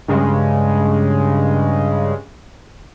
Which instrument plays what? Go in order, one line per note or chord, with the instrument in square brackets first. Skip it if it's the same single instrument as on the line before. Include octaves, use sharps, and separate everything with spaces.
[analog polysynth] G2 C#3 G#3